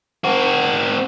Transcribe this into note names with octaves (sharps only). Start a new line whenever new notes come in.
C4 F#4